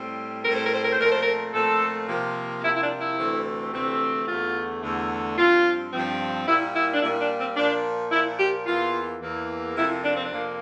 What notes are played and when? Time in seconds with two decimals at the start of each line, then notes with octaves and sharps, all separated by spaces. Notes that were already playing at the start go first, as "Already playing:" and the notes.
Already playing: A2 G3 C4
0.43 A2 G3 C4 A#4
0.54 C5
0.63 A#4
0.73 C5
0.82 A#4
0.92 C5
0.98 A#2 F3 A3 C4 A#4
1.10 C5
1.20 A#4
1.53 A#2 F3 A3 C4 A4
2.08 C3 F3 A#3
2.63 C3 F3 A#3 E4
2.74 E4
2.81 D4
2.99 E4
3.18 D2 C3 E3 A3 C4
3.72 D2 C3 E3 A3 C4
4.27 E2 D3 A3 F4
4.82 E2 D3 A3
5.37 G2 F3 C4 F4
5.92 G2 F3 C4
6.47 A#2 G3 A#3 E4
6.74 E4
6.93 D4
7.01 A#2 G3 A#3 E4
7.20 D4
7.39 C4
7.56 A#2 F3 A#3 D4
8.11 A#2 F3 A#3 E4
8.39 G4
8.66 E2 E3 A#3 F4
9.20 E2 E3 A#3
9.76 F2 C3 F3 A#3 E4
10.03 D4
10.13 C4
10.23 D4
10.30 F2 C3 F3 A#3